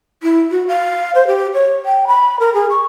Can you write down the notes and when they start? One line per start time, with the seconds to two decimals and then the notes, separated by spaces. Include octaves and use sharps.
0.23 E4
0.51 F#4
0.68 F5
1.15 C5
1.27 G4
1.54 C#5
1.86 G5
2.07 B5
2.40 A#4
2.54 G#4
2.70 C#6